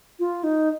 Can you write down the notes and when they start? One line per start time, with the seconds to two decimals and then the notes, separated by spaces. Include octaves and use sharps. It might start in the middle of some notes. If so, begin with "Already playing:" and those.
0.19 F4
0.44 D#4